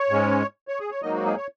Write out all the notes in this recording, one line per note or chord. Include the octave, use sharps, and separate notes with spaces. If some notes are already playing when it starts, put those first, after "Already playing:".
Already playing: C#5
G#2 G#3 C#4
C#5
G#4
C#5
G#2 F#3 A#3 D#4 D#5
F#4
G#4
C#5